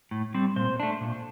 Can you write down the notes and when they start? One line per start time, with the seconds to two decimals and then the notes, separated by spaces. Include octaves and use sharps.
0.11 A2
0.34 G3 C4
0.56 A#2 C5
0.80 A3 D4
1.01 A#2